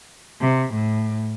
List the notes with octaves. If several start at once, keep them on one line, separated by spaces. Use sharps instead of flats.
C3
A2